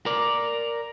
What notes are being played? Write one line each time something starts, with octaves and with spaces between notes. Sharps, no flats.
A#4 D5